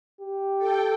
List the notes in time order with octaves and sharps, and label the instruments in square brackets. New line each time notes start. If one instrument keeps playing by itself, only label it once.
[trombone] G4
[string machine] A4 G5